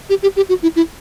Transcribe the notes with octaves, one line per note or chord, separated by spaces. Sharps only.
G4
G4
G4
F#4
E4
E4